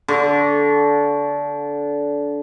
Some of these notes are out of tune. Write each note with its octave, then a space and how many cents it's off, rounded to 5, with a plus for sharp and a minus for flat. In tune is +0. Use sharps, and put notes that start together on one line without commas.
D3 -20 C#6 +0